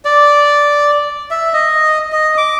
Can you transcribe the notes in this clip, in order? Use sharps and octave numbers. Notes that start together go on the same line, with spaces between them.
D5
E5
D#5
D#5
D6